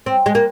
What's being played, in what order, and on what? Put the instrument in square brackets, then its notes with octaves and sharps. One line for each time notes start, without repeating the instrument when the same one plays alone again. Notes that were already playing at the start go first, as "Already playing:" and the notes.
[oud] C4
G#3
A#3